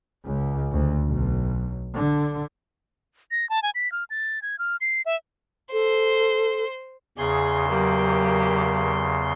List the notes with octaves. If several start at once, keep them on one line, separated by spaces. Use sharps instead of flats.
C#2
D2
B1
D3
A#6
A5
G#5
B6
F6
A6
G#6
F6
C7
E5
A4 C5
E2 C#3 G#4 C6
F#3 A#3 G4